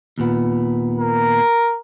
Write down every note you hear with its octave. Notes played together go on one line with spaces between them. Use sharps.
D#2 A#2 B3
A#4